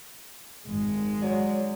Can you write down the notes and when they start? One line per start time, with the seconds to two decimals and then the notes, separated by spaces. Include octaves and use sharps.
0.66 G#1 F2 D#3 G#3
1.22 F#3 C#5 D5